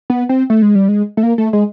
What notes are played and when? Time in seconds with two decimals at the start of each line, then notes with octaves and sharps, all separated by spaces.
0.10 B3
0.29 C4
0.50 A3
0.62 G#3
0.75 G3
0.88 G#3
1.17 A3
1.23 A#3
1.38 A3
1.53 G#3